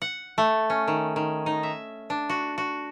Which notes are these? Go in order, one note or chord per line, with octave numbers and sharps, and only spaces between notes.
F#5
A3
C#4
D#3
D#3
D#4
E5
D4
F#4
F#4